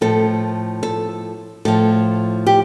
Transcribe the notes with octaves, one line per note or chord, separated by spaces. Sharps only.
A2 F3 A4
A4
A2 F3 A4
G4